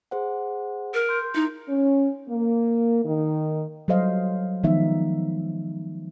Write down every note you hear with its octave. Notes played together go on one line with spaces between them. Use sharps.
G#4 C5 F#5
A#4
C6 G6
D#4 E4
C#4
A#3
D#3
F#3 G3 A4 C5 D#5 F5
D#3 F3 G#3 B3 D#4 E5